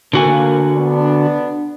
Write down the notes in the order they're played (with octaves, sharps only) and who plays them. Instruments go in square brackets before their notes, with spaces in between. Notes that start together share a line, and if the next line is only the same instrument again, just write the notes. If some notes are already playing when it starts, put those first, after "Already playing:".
[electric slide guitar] D3 F#4 G#5 [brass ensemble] A#3
[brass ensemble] B3 D4